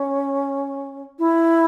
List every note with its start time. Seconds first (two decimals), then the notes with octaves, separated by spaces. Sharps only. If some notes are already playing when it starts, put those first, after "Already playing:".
Already playing: C#4
1.19 E4